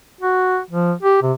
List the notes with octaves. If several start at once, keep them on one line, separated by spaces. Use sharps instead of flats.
F#4
F3
G4
C3